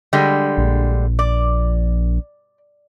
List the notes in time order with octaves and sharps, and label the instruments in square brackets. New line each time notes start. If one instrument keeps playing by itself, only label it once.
[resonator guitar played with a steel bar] D3 G3 G#3
[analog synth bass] A#1
[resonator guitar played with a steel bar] D5